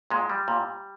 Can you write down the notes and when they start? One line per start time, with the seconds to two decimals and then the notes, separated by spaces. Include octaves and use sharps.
0.10 A#2 G#3
0.30 G3
0.48 A#2